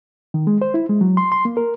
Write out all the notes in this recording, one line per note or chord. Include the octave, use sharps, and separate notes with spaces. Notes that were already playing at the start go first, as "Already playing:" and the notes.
D#3
G#3
C5
E4
G#3
F#3
C6
C6
A#3
A#4